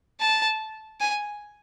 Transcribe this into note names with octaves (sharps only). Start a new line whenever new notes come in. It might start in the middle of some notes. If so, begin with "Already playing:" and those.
A5
G#5